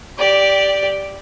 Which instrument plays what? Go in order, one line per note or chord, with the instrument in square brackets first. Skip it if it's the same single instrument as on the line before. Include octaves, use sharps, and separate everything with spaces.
[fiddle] G4 D5